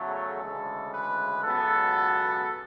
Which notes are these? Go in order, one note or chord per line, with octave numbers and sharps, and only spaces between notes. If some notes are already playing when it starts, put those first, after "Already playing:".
Already playing: E2 C#3 F#3 A3 A4
D2 C#3 E3 G#3
B4
C#2 B2 F#3 B3 A4